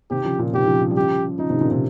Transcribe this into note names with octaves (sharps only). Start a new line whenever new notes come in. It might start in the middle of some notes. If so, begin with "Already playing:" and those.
C3 D#3 G4
C#3 F3
A#2 C#3
G#2 C3 G4
C#3 F3
F3
G3
C#3 F3 G4
C#3 F3 D#4
C3 D#3
A#2 C#3
C3